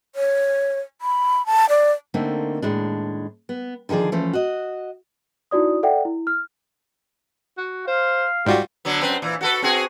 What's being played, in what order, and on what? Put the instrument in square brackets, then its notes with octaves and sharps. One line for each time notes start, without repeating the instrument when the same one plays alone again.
[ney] C#5
B5
A5
D5
[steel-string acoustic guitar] D3 A3 A#3 C4 D#4
D#2 A2 G#3 D4
B3
D3 D#3 F3 G#4 D5
E3 F3 A3 C#4
F#4 D#5
[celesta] D#4 E4 F#4 D5 D#6
A4 D5 E5 F#5 G5
E4
F6
[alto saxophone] F#4
[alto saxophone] C5 [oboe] F5
[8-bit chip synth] G#2 F4 F#4 [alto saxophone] G3
[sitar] D3 F#3 B3
F#2 C4 B4
A#2 E3
F#4 A4 B4
C4 F#4 G#4